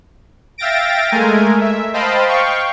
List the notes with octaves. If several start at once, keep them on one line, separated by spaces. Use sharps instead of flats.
E5 F5 G5 A6 A#6 D7
G#3 A3 A#4 G#5
E5
C5 D#5 F5 G5 A5 B5
F5 G5 C#6